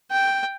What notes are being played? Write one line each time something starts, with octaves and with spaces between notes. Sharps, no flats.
G5